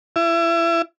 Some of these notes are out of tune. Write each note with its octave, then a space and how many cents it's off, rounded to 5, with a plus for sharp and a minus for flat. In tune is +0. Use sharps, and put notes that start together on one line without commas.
E4 +30